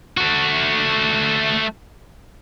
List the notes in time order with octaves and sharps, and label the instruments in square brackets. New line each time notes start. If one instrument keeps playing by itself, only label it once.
[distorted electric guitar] A3 F#4